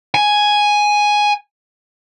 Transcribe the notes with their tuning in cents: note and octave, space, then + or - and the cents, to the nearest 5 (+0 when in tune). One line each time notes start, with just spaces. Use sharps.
G#5 +0